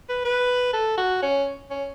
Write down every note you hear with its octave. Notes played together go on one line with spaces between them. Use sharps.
B4
B4
A4
F#4
C#4
C#4